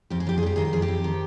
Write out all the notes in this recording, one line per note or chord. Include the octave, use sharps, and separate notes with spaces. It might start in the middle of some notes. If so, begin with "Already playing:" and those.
F2 G4
G#4
F2 G4
G#4
G3 G4
D#3 G#4
G4
F2 G#4
G4
F2
D#3